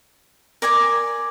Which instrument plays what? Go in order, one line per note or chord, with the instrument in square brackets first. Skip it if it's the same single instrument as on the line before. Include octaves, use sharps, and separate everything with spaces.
[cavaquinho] A#4 D5 G#5 D6